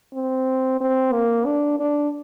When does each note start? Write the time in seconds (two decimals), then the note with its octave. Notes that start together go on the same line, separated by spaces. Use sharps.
0.14 C4
0.81 C4
1.13 A#3
1.46 D4
1.80 D4